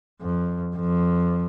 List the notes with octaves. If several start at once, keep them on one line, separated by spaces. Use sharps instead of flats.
F2
F2